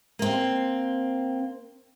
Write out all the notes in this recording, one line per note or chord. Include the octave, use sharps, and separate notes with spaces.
A#3 C4